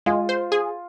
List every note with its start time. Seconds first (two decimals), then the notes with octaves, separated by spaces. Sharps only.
0.06 G#3 F4
0.29 C5
0.52 G#4